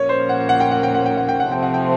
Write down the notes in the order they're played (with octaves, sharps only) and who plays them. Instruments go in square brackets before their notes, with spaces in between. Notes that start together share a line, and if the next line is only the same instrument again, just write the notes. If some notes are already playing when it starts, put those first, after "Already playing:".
Already playing: [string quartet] A#2 F3 A#3 C#4 [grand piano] C#5
[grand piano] C5
F#5
F#5
G5
F#5
G5
F#5
G5
F#5
G5
F#5
[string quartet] C3 F3 A3 C4 [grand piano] G5
[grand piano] F#5
G5